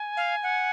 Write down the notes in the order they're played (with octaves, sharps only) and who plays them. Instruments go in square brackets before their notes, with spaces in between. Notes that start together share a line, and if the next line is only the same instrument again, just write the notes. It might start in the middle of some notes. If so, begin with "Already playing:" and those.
Already playing: [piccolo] G#5
[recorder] F5
F#5